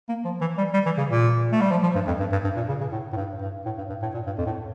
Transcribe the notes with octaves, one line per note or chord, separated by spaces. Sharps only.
A#3
F3
E3
G3
G3
E3
C#3
A#2
A3
G3
F3
F3
G2
F2
G2
G2
G2
A#2
C#3
C#3
A2
A2
G2
G2
A2
G2
G2
A2
A#2
G2
F2
A2